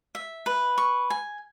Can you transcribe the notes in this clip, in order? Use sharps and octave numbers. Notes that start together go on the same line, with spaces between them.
E5
B4
C#6
G#5